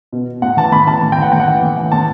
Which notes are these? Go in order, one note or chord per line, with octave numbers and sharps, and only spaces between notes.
B2
A2 F#5
E3 A5
A2 B5
E3 A5
A2
G5
E3 F#5
A2 G5
F#5
E3
A2
E3
A2 A5